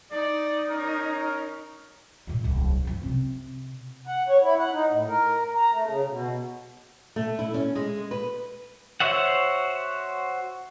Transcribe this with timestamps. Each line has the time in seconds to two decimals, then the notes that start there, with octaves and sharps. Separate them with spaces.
0.12 D#4 D5
0.69 C#4 A#4
2.27 A#2 A#3
2.44 D1 C2
2.85 F#2 F3
3.03 C3
4.07 F#5
4.28 C#5
4.42 E4
4.59 F#5
4.73 D#4
4.90 A2
5.08 A#4
5.55 A#5
5.72 A3
5.87 C#3
6.08 B2
7.16 A3
7.39 E4
7.54 C#4
7.75 G#3
8.11 B4
9.00 F#4 C5 C#5 E5 F#5